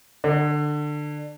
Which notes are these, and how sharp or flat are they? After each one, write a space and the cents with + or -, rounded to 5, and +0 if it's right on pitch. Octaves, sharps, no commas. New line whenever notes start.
D3 +20